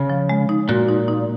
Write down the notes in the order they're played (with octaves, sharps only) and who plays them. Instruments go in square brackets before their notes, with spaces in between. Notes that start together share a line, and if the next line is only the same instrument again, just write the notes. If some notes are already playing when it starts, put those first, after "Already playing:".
Already playing: [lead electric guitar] C#3
[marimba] F3
G#3
D#4
[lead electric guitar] A#2 [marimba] F#4
[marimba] D#4
D#4